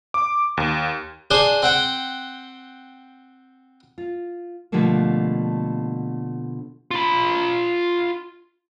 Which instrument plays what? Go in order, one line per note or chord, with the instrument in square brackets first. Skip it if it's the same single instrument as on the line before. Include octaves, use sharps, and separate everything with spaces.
[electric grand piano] D6
D#2
[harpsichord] D4 G#4 C5 C6
C4 F#5 G5
[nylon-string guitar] F4
B2 D3 F3 G3 A3 A#3
[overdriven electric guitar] F4 B5